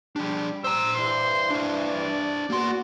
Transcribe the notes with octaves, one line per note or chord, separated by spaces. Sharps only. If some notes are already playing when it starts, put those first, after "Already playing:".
G3 D4 G4 G#4
C5 A#5 E6
G2 E3 C6
D4 C5
D5
E2 A#3 F#4 C6